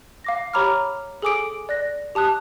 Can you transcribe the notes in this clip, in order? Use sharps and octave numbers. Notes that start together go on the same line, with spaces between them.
F5 D6 A#6
G4 C#5 A#5 B5 D6 F6
G#4 A4 G#5 D6 D#6 D7
D5 F#6 A#6
G4 A5 D#6 F#6